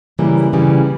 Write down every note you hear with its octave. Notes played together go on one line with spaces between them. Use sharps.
C#3 E3 G3 A#3
C#3 E3 G3